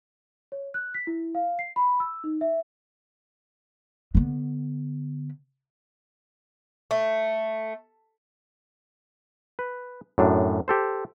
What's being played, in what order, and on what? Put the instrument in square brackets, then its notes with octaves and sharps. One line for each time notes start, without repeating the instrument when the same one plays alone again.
[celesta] C#5
F#6
B6
E4
F5
C7
B5
E6
D#4
E5
[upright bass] D3 B3
[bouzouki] A3
[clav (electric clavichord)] B4
F#2 A2 D4
G4 A4 C5